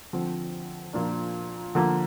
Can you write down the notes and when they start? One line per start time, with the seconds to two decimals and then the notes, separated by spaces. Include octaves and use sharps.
0.13 D3 F3 C4
0.93 A#2 F3 A#3 D4
1.75 D3 F3 A#3